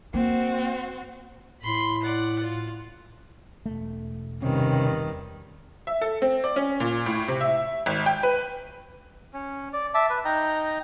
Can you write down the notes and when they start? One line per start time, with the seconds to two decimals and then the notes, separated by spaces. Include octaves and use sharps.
0.14 A#3 C4 F#4
1.62 A2 B5 C6
2.03 D5 F#5
2.43 F4
3.66 E1 A3
4.42 G2 C3 D#3 C#4
5.87 E5
6.02 A4
6.22 C4
6.44 D5
6.56 C#4
6.80 A#2
7.06 A2
7.28 C3
7.41 E5
7.86 G#1
8.06 G5
8.23 B4
9.34 C#4
9.73 D5
9.94 E5 A5 D6
10.10 B4
10.25 D#4 D#5 G5 A#5